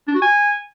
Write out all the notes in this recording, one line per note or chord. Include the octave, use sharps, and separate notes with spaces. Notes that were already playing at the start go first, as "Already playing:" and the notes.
D4
F#4
G#5